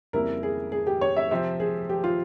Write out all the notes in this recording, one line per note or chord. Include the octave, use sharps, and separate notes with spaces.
F2 C#3 G3 A#3 E4 A#4
G#4
G#4
G4
C#5
E5
C3 F3 C4 G4 C5 E5
G#4
G4
F4